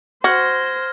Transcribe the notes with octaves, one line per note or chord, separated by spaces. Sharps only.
F#4 C5 F6 G#6 A#6